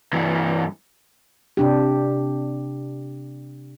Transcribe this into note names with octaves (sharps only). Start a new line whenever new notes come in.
G2 E3
C3 D4 G4